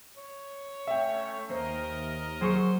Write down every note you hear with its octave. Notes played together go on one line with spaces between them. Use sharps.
C#5
A3 C#4 E5 G5
D#2 A#3 A#4 C5 D#5
F#3 G#4 C5 C#6 C#7